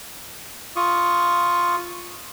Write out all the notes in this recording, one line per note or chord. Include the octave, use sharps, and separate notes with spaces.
F4 C#6 D#6